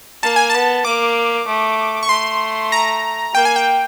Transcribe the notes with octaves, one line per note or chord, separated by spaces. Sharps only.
A#3 A5
G#5
B3 A5
A#3 D6
A3
C#6
A3 C6
A#5
A#3 G5
G#5
G5